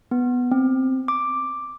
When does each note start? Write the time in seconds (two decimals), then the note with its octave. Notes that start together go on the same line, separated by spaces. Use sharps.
0.11 B3
0.51 C4
1.08 D6